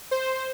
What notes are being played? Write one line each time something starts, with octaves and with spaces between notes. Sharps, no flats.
C5